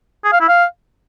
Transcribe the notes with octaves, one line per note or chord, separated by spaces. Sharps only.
G#4
F5
E4
F5